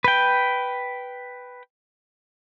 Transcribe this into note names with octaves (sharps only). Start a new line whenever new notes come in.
B4 G5